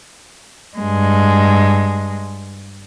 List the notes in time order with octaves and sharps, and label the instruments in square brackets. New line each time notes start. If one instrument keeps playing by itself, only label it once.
[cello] G2 G#3